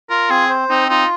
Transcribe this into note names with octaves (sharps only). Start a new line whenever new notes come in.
F4 A#4
C4 G#4
C5
C4 D#4
D#4 F4